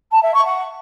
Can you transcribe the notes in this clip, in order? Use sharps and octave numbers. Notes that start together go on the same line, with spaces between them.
A5
E5
C#6
F#5